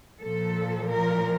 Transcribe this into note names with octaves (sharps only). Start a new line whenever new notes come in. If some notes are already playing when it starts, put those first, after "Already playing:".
A#2 F3 A4
A#4